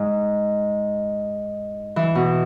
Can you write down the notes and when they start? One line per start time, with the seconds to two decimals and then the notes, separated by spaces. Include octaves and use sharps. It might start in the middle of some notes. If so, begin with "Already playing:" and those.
Already playing: G#2
1.96 E3
2.15 B2